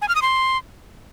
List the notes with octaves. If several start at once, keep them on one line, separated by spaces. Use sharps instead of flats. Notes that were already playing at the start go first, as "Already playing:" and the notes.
G#5
F6
D#6
C6